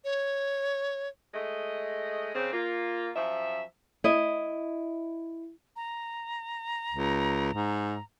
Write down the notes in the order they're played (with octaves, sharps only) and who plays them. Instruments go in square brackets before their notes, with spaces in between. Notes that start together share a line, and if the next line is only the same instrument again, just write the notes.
[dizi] C#5
[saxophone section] G#3 A3 D#5
C#3 C4
A#3 F4
F#2 F3 E5
[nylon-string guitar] E4 D#5
[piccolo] A#5
[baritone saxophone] C#2
G#2